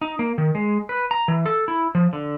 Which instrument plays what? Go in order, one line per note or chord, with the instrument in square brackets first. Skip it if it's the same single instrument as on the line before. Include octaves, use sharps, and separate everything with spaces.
[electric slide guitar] D#4
A#3
D#3
G#3
B4
A#5
E3
A4
E4
F3
D3